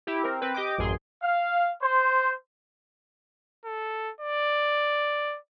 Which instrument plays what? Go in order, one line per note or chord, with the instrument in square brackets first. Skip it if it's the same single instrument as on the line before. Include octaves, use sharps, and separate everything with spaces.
[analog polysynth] E4 G4
C4 A#4
C4 B4
G4 D#5 G5 D6
A1 F#2 G#4 C6
[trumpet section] F5
C5
[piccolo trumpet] A4
D5